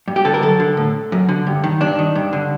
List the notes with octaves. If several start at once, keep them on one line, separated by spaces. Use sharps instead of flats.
G2
G4
D3 A4
A#4
F#2 A4
D3
A2
F#2
D3
G2
D#3
G2 D4
D#3
G2
D3